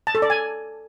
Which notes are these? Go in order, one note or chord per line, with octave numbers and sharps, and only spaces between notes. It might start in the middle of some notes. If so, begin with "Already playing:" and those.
A5
A4
D5
G#5